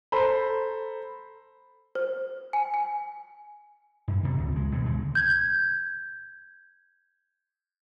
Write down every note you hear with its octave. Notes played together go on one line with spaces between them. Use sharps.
A4 C5 A#5 B5
C5
G#5
G#5
F#2
D1 C3 B3
C#2
C#2 G#3
B2 D#3 G3
D2 C#3 G#3
G6 G#6